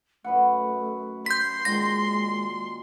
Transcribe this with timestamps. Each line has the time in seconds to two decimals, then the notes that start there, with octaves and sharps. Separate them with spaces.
0.24 F#2 A3 B4 F#5
1.26 C6 G6 B6
1.65 A#2 D#3 G#3 A#6